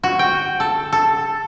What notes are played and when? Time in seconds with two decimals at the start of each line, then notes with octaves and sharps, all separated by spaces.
0.04 F#4
0.19 G5
0.60 A4
0.92 A4